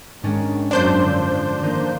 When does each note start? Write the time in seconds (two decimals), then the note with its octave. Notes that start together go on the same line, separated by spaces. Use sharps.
0.24 G#2 D#3 G#3 C#4 D4 A6
0.71 F#2 F#3 A#3 D4 C5 C6 G6
1.03 D3 F3
1.63 D#3 A#3 D#4